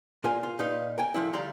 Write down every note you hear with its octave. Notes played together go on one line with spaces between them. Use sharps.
A#2 F4 A#4 G#5
F4
A#2 D#4 B4 F5
A#4 G5 G#5
A2 F3 D4 E4
D2 G3 D5 F5 A#5 C6